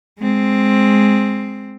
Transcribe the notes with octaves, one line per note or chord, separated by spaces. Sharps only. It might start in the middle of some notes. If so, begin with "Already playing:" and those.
G#3 C4